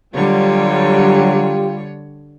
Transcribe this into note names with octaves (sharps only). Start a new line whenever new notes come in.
D3 F#3 G3 F4 G4 C#5